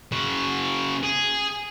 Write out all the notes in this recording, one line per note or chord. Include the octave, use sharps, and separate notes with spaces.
C#3 F#4
G#4